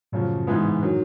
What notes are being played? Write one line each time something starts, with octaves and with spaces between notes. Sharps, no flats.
F#2 A2 C#3 F3
G#2 E3 G#3 B3
D#3 F#3